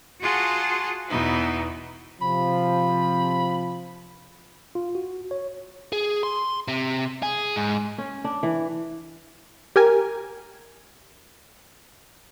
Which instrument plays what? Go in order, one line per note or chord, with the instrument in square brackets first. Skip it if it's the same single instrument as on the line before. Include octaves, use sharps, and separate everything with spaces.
[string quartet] F4 F#4 G#4 F#5 A5 C6
E2 B2 B3 D#4 E4
[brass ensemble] C3 F3 [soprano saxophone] B5
[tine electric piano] F4
F#4
C#5
[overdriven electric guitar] G#4
C6
C3
G#4
G#2
[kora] C#4
D4
E3
[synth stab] G4 A#4 G#5